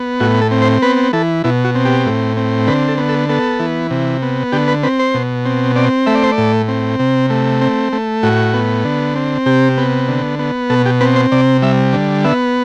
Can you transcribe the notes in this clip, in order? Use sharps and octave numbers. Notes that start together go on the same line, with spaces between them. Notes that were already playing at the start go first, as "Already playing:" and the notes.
Already playing: B3
A2 F#4
A4
C4
C5
B3 B4
E3 A4
B2 E4
F#4
C4
G4
A2
C4
D3 B4
A4
B3
A4
B3 A4
E3
C3
B3
D3 G4
B4
C4 B4
C5
B2
C4
C4 D5
A3 E5
D5
C5
D5
A2
C4
C3
A3
C4
A3
A2 F#4
B3
D3
C4
C3 G4
B3
D3
B3
B2 A4
G4
C4 B4
C5
C3 D5
G3 E5
D3
B3 E5